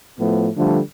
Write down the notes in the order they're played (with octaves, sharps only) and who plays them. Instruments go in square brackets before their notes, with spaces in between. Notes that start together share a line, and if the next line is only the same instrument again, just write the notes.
[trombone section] A2 F3 A3 B3
D3 F3 G3 A3